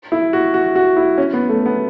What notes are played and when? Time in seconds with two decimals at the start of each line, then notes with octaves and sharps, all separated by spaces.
0.12 E4
0.33 F#4
0.54 F#4
0.76 F#4
0.97 E4
1.18 C#4
1.33 B3
1.49 A3
1.66 B3